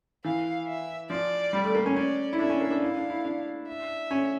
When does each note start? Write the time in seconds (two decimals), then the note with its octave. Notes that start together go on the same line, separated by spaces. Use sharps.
0.24 E3 F5
0.67 E5
1.10 F3 D5
1.53 G3
1.64 A3
1.75 A#3
1.86 C#4
1.96 C#4 D5
2.33 E4
2.39 D4 E5
2.50 C#4
2.60 A#3
2.71 D4
2.81 E4 F5
2.96 D4
3.10 E4
3.25 D4
3.68 E5
4.11 C#4